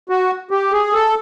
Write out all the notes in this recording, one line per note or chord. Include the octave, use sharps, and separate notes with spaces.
F#4
G4
G#4
A4